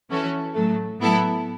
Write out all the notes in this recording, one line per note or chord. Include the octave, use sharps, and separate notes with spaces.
E3 C#4 F#4 A4
A2 F#3 A3
A2 F#3 B3 E4 A4